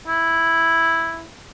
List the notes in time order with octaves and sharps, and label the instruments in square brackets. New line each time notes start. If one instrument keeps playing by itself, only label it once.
[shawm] E4